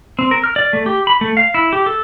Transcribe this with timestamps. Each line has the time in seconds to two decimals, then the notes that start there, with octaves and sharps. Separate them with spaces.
0.19 C4
0.31 A#4
0.44 F6
0.56 D5
0.73 A3
0.86 G4
1.07 B5
1.21 A3
1.37 F5
1.54 E4
1.73 G4
1.86 A4